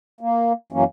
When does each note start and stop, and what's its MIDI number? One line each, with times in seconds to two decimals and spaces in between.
0.21 0.53 58
0.73 0.84 42
0.73 0.84 52
0.73 0.84 54
0.73 0.84 58
0.73 0.84 61